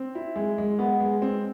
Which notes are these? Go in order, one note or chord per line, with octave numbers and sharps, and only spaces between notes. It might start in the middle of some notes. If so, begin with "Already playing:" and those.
Already playing: C4
E4
G#3
G#3
B3
G#3
C4